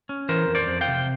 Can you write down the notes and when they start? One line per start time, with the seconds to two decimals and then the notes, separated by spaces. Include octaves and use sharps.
0.09 C#4
0.29 E3 A#4 C5
0.48 F2
0.55 C5 D5
0.67 F2
0.81 F5 G5
0.88 C3